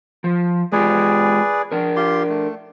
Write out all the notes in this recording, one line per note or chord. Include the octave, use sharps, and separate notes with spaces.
F3
G#3 F4 G4 G#4 B4 D5
D4 A#4
F4 G4 C6
A3